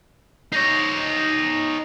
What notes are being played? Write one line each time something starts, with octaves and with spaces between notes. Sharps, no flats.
D#4 C#5 A#6 C7